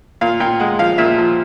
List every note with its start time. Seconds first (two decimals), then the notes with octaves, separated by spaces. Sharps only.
0.21 A#2 F5
0.40 A#2 G5
0.60 G#3 F#5
0.79 F3 F5
0.98 A#2 E5
1.18 F3